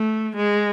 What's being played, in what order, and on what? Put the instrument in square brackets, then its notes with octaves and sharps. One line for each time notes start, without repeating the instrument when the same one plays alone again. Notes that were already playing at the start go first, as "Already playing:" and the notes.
Already playing: [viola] A3
G#3